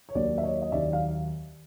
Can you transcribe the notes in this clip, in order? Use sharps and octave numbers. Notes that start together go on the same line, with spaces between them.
C#5
D#2 D#3 F#3 A#3 D5
E5
C#5 D#5
D#5
D#2 D#3 F#3 A#3 D5 E5
F5